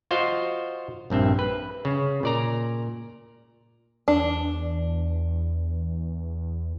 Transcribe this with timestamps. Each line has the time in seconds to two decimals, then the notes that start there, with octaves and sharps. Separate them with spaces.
0.11 F4 F#4 C5 D#5 F5 F#5
1.10 A#1 G2 C4 E5
1.39 B4
1.85 C#3
2.23 A#2 D5 A#5
4.08 E2 D4